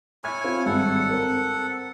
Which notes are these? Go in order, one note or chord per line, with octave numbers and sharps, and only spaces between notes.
E4 C#5 G#5 F6 G#6
C4 F4
G#1 G2 A4 F#5
C4 A#4